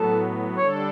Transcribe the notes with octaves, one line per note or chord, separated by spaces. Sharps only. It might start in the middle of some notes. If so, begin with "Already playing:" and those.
Already playing: A2 F#3 B3 A4
D3 G3 D4 A4 C#5